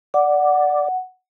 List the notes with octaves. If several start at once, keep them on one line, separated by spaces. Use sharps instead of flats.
D5 F#5